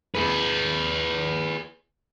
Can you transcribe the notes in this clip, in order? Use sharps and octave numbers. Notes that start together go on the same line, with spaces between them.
G#4 B4